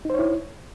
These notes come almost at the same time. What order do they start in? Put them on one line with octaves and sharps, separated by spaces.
D#4 C5 C#5 E4